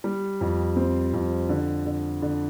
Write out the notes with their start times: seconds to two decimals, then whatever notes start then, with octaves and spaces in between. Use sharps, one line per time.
0.04 G3
0.41 F2
0.76 C4
1.14 F2
1.49 D3
1.86 D3
2.22 D3